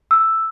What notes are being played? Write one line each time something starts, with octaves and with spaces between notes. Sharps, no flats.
E6